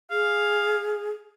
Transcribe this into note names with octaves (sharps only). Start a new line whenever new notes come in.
G#4 F5